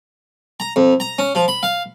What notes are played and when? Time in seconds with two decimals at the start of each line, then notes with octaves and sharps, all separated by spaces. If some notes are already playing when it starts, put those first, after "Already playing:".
0.60 A#5
0.76 F2
1.00 A#5
1.19 C#4
1.35 F3
1.48 B5
1.63 F5